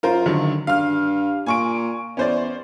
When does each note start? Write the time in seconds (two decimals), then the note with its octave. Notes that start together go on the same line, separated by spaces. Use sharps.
0.03 F#2 F4 A#4 C5
0.26 D3 D#3 F#3
0.67 G2 F5 F6
1.46 A#2 G#5 C#6 D7
2.17 E2 C#4 C5 D5